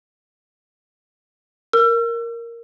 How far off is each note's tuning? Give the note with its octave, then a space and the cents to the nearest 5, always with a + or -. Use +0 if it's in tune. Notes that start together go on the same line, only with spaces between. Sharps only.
A#4 +0 E6 +40